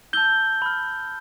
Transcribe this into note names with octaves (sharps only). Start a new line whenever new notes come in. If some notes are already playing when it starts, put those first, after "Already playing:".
A5 E6 G6 G7
B5 F6